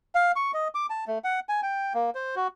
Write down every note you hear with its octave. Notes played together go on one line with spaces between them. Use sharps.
F5
C#6
D#5
D6
A5
A3
F#5
G#5
G5
A#3
C5
F#4